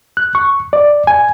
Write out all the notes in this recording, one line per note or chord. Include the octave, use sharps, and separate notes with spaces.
F#6
C#6
D5
G#5